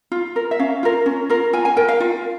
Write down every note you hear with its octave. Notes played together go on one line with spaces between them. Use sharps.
F4
A#4
E5
C#4 F5
F4 A#4
C#4
F4 A#4
F4 G#5
G#5
A#4 G5
F5
F4